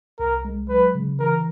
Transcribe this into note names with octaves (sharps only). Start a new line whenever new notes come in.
C2 A#4
G#3
F#3 B4
C#3
E3 A#4